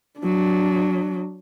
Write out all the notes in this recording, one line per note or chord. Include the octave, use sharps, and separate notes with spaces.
F#3 D4